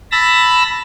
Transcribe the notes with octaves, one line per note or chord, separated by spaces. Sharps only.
A5 B5 E6 A#6